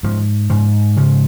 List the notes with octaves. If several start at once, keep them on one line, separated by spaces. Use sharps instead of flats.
G#2 F3
G#2 F3
C#3 F3